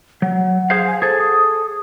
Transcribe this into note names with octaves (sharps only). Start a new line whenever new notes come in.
F#3 F#5
G#4 C5 F5
G#5
G#4 A4 C5
D#6